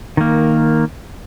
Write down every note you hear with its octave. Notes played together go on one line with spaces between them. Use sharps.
D#3 A#3